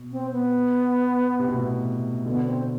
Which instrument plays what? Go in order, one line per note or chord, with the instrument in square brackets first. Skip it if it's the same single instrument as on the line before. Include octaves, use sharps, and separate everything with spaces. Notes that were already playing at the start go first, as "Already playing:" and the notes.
Already playing: [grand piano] B2
[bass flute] C4
B3
[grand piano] C3
B2
A2 C3
[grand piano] B2 D3 [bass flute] B3
[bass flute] C4